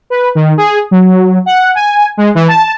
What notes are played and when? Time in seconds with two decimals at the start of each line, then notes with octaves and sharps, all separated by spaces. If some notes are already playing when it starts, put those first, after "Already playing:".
0.10 B4
0.35 D#3
0.57 G#4
0.91 F#3
1.46 F#5
1.75 G#5
2.17 G#3
2.35 E3
2.48 A5